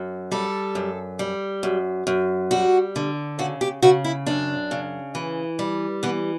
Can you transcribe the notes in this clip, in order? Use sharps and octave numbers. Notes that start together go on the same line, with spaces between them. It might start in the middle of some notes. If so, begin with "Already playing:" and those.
Already playing: F#2
G3 A4
F#2
G3
F#2
F#2
G3 F#4
D3
C#3 F#4
G4
C#3 F#4
E4
F#2 D4
C#3
E3
G3
E3 B3